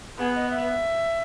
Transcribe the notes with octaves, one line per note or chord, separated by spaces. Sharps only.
B3 G#4
D#5
E5